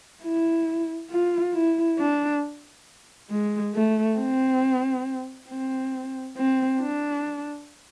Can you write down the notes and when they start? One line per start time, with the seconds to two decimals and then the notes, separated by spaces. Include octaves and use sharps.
0.23 E4
1.11 F4
1.54 E4
1.99 D4
3.30 G#3
3.74 A3
4.18 C4
5.49 C4
6.37 C4
6.81 D4